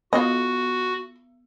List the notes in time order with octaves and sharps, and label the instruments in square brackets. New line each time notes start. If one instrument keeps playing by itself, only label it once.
[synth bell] B3 [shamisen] F4 D#5 [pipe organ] F#4